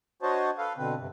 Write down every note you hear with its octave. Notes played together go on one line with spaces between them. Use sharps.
D4 F#4 C5 C#5 D#5 A5
A4 B4 F5
B2 D3 C4 B4
G2 C3